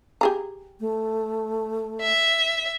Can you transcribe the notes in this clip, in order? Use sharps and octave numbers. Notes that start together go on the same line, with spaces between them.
G4 G#4 A#5
A3
E5